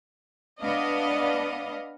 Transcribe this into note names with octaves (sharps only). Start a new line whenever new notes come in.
B3 D4 D#5 F5